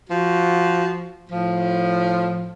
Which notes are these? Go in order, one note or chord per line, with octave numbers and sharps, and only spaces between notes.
F3 F#4
A2 F3